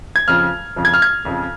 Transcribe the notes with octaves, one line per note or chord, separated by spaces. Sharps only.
G#6
F2 C#3 F3 F6
F2 C#3 F3
G#6
F6
G#6
F2 C#3 F3